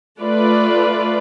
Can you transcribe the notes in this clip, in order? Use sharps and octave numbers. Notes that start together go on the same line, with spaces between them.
A3 F4 B4 D5